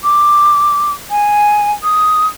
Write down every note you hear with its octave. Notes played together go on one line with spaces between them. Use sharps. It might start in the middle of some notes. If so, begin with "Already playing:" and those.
D6
G#5
D#6